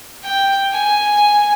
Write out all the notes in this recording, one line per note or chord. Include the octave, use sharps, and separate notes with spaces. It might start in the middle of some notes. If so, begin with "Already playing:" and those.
G5
G#5